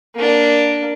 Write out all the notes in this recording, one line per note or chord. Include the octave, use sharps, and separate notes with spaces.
A#3 D4